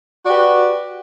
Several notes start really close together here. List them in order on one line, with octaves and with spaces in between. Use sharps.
F#4 D5 G4 B4